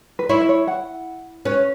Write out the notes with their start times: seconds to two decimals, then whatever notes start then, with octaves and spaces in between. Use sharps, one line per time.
0.19 B4
0.29 E4 C#5
0.42 E5
0.49 C#5
0.67 F#5
1.45 C#4 B4